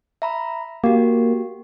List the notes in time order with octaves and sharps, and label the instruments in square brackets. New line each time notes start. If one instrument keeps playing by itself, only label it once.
[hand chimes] E5 A#5 B5
[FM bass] A#3 [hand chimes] F#4 G4